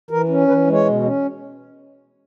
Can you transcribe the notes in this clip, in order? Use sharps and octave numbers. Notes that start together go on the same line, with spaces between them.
E3 A#4
C#4
E3 B4
G#3
C#5
B2
C#4